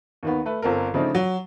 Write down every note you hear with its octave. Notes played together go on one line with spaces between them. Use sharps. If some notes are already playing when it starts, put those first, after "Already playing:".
D#2 D#3 B3
A3 B4
G1 C4 A4 A#4
C#3 F3 A3 C4 D4 D#4
F#3